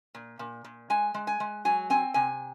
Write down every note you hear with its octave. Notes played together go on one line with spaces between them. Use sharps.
A#2
A#2
A#2
G#3 G#5
G#3
G#5
G#3
F#3 G#5
C4 G#5
C3 G#5